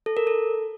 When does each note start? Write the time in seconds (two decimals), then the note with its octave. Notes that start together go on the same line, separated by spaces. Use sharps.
0.06 A4
0.17 A#4
0.27 A4